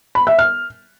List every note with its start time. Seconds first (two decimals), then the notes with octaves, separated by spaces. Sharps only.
0.15 B5
0.27 E5
0.38 F6